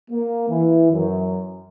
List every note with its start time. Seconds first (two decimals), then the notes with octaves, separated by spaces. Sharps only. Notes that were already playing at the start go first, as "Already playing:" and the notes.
0.11 A#3
0.50 E3
0.91 F#2